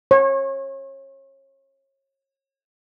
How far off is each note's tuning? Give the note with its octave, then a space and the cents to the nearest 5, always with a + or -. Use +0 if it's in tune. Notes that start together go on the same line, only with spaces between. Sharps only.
C#5 -35